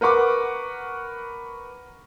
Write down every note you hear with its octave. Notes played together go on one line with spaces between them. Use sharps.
A#4 B4 F#5 C#6 D6